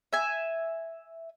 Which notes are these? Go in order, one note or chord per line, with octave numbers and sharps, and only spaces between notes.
E5 G#5